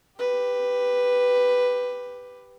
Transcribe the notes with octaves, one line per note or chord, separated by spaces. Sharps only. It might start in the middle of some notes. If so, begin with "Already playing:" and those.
G4 B4